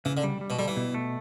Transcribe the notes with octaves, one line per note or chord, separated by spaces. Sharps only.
C#3 E3
D3
G3
G3
B2
D3 G3
E3
B2
A3